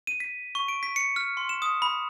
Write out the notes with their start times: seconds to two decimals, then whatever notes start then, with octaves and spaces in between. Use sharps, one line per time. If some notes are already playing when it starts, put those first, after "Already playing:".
0.07 D#7
0.20 B6
0.55 C#6
0.68 D7
0.83 B6
0.96 C#7
1.16 F6
1.37 C6
1.49 E7
1.62 D#6
1.82 B5